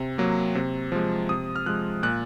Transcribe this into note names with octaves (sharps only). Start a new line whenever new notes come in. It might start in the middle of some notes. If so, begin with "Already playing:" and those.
Already playing: C3
F#3 A#3
C3
F3 G#3
C3 D#6
F6
F3 G#3 F#6
A#2 F#6